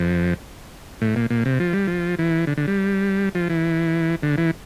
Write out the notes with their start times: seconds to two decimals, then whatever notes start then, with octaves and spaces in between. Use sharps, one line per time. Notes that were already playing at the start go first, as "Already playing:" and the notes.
Already playing: F2
1.01 A2
1.16 A#2
1.30 A#2
1.45 C3
1.60 F3
1.73 G3
1.87 F3
2.19 E3
2.47 D3
2.57 D3
2.67 G3
3.35 F3
3.50 E3
4.23 D3
4.38 E3